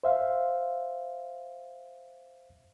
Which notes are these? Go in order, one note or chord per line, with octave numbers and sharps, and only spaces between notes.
C5 E5 F5